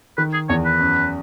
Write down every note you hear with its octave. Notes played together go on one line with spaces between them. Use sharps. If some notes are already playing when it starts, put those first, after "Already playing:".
D#3 B4
G#4
E2 C#5
B4
F#2